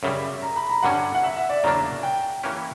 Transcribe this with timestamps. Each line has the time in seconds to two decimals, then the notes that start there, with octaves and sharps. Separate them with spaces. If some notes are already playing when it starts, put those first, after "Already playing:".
0.03 F#2 C#3 G3 E5
0.42 A#5
0.56 B5
0.70 A#5
0.83 G2 D3 G3 C#4 F#5
1.15 F#5
1.23 E5
1.37 E5
1.49 D5
1.63 E2 C#3 F#3 A#3 D4 A#5
2.03 G5
2.43 E3 A#3 C#4 G4